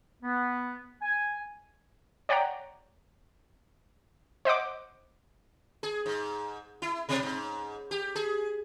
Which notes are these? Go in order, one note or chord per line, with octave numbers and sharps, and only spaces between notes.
B3
G#5
C#5 D5 F#5 G5 A#5
C5 D#5 F#5 D6
G#4
G#2
E4
B2
G#2
G4
G#4